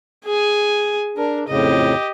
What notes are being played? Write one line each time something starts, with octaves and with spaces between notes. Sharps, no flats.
G#4 G#5
D4 A#4
F2 A2 C#3 G4 D#5